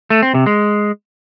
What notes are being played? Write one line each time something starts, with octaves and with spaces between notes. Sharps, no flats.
A3
C4
C3
G#3